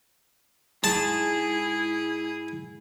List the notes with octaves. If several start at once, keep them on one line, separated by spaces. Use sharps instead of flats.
G#2 G#3 E4 G#4 A5